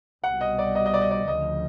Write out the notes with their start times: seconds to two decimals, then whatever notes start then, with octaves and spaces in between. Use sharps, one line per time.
0.23 C2 B2 G3 F#5
0.41 D#5
0.59 D5
0.75 D#5
0.86 D#5
0.94 D5
1.01 D#5
1.11 D5
1.27 D2 C#3 F3 D#5